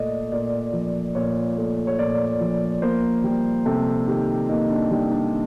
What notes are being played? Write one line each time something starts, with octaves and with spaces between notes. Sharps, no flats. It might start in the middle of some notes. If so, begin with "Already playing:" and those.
Already playing: A#2 A3 D5 D#5
A#2 D5
F3
A#2 C#5
A3
C#5
A#2 D5
F3
A#3 C5
G3
C3 A4
D#3 G4
A#3 D#4
D4
G3 D#4
D4